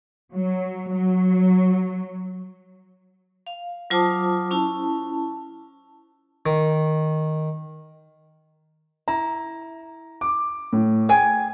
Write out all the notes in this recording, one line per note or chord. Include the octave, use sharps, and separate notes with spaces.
F#3
F#3
F5
F#3 F4 C5 A5 D6 D#6
C#4 E4 A5
D#3
E4 A#5
D6
A2
G#4 G5 G#5 G#6